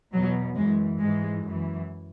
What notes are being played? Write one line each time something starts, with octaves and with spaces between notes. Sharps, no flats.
E2 B2 F#3
F#2 E3 G#3
G#2 E3 G#3
F#2 E3